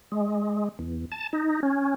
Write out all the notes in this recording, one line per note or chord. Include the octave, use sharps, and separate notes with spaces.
G#3
E2
A5
D#4
C#4